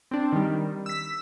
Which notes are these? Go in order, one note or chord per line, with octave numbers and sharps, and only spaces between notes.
C4 D4
D#3 G3
E6 B6